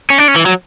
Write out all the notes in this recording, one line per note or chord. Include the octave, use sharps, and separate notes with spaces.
C#4
D4
C#4
E3
F#3